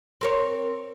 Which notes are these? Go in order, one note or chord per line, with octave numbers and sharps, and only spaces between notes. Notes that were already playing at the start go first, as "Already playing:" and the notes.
C4 A#4 C#5